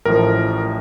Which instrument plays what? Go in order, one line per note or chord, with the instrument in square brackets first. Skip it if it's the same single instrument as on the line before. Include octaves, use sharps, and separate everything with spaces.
[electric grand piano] A1 A2 F3 A#4